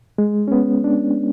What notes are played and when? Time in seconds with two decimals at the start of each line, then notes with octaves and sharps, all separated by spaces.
0.18 G#3
0.48 C#4
0.52 B3
0.84 D4